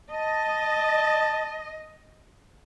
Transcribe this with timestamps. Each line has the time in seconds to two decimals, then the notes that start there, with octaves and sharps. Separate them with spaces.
0.11 D#5 A5